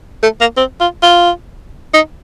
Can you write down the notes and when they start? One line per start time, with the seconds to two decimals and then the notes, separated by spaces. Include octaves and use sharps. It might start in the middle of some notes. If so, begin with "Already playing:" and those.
0.23 A3
0.41 A#3
0.57 C4
0.80 F4
1.02 F4
1.94 D#4